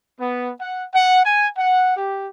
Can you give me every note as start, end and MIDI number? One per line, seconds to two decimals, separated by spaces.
0.20 0.51 59
0.61 0.84 78
0.94 1.21 78
1.24 1.49 80
1.58 1.94 78
1.96 2.27 67